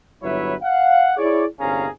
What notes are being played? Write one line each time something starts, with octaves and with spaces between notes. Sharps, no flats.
G1 F#3 E4 B4 C#5 E5
F5 F#5
E4 G#4 C#5 D5
G1 C2 C#4 G#4 F5 A#5